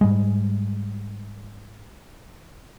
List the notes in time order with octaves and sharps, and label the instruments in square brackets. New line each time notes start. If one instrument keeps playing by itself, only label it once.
[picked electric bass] G#2 G3 G#3